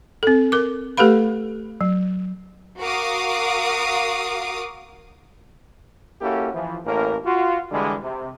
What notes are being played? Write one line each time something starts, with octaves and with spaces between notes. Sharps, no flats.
C4 A4
A#4 D6
A3 G4 A4 B4 F5 B5
F#3
F#4 A#4 F5 D6 D#6
A#3 C#4 E4 F#4 G4 A4
E3 F3
A1 A2 A#3 C#4 A#4
F4 F#4
D3 E3 G3 G#3
C3